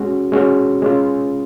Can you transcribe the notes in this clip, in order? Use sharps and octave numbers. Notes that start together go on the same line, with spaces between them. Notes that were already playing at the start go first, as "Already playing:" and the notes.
Already playing: G#3 C#4 F#4
G#3 C#4 F#4
G#3 C#4 F4